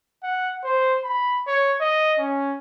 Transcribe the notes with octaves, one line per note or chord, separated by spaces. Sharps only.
F#5
C5
B5
C#5
D#5
C#4